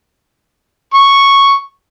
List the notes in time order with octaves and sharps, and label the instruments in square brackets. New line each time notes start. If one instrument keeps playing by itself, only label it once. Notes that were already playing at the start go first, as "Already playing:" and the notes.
[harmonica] C#6